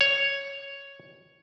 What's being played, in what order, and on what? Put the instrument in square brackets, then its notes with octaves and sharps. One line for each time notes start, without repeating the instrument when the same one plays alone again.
[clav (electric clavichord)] C#5